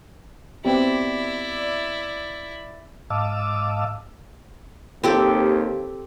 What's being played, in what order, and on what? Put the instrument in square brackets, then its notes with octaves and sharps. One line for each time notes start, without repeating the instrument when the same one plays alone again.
[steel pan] B3 C4 G4 [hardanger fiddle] E4 [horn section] D5
[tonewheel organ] G#2 D#5 F5 A5 D6 E6
[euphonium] D#2 [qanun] C4 G4 A4